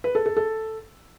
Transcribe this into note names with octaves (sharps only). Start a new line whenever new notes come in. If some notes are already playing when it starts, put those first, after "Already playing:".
B4
A4
A4
A4